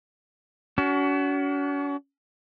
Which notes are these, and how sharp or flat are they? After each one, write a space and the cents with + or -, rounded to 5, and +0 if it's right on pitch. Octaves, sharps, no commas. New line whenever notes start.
C#4 +45 F#4 +25